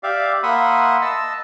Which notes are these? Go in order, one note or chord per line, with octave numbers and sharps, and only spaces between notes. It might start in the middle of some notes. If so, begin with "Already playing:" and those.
G4 D5 E5 F5
A#3 E5 F#5 B5 C6 D#6
D#5 A5 E6